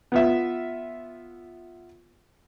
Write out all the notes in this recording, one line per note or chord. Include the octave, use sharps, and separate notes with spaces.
B3 F4 E5